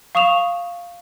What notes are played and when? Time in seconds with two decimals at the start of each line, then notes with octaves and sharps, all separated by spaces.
0.15 F5 C#6 D#6 E7 F7